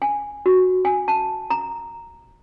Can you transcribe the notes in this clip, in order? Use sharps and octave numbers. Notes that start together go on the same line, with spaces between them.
G#5
F#4
G#5
A5
A#5